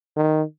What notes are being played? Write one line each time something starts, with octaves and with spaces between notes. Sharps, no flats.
D#3